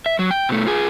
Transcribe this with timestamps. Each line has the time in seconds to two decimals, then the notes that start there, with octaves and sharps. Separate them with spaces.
0.06 E5
0.19 F#3
0.31 G5
0.49 B2 A3
0.66 F4 G#4